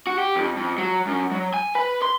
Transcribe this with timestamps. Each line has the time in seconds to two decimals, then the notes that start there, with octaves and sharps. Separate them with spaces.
0.07 F#4
0.18 G4
0.36 F2
0.56 F2
0.78 F#3
1.07 F#2
1.32 F#3
1.54 G#5
1.75 B4
2.02 C6